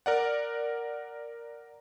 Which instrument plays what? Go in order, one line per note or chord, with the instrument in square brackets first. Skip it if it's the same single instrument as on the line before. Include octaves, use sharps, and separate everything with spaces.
[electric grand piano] A#4 D5 F#5